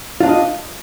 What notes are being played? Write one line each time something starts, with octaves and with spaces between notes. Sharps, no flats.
D4 F4 D#5 F5